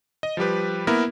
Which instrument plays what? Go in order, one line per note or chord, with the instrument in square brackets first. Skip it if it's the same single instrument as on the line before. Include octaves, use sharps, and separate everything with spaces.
[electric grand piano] D#5
F3 G3 G4 B4
A#3 B3 E4 A#4